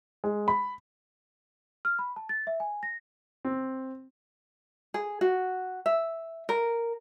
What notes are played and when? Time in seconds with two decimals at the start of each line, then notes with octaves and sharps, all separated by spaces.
0.24 G#3
0.48 B5
1.85 F6
1.99 B5
2.16 A5
2.29 A6
2.47 E5
2.60 G#5
2.83 A#6
3.45 C4
4.94 G#4
5.21 F#4
5.86 E5
6.49 A#4